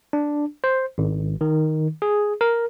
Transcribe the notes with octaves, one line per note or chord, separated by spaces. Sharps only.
D4
C5
G#1
D#3
G#4
A#4